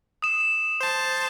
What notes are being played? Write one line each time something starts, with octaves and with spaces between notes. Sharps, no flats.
D#6 E7
C5 A5